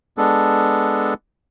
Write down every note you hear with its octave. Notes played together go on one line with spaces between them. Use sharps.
G#3 B3 D4 A4